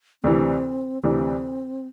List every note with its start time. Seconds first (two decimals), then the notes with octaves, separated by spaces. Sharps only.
0.23 D2 C3 E3 C4
1.03 D2 C3 E3 C4